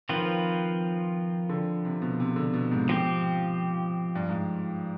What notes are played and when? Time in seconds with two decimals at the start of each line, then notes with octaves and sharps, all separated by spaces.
0.09 D#3 F3 C4 F4 B4
1.49 D3
1.85 C3
2.02 B2
2.20 C3
2.36 D3
2.53 B2
2.71 G#2
2.89 F3 C4 G4
4.15 G2
4.29 G#2